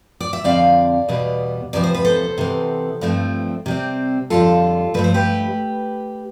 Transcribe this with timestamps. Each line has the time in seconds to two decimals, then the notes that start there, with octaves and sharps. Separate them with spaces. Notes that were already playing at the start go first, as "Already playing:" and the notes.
0.20 D5
0.33 E5
0.44 F2 D3 F3 C4 D5 F5
1.08 E2 B2 G3 B3
1.73 E2 C3 F3 B3 D5
1.84 C5
1.95 B4
2.05 A4 C5
2.38 C3 E3 B3
3.01 G2 F3 A3 C4
3.66 C3 G3 C4
4.30 F2 D3 G3 F4 A4
4.94 G2 F3 A3 B4
5.04 C5
5.14 G4 B4